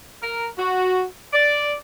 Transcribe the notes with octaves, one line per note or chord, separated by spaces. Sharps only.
A#4
F#4
D5